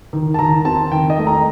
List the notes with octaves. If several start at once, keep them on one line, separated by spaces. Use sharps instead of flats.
D#3
A5
D#3 A#5
C4 A5
D#3 G5
D#5
A3
A#5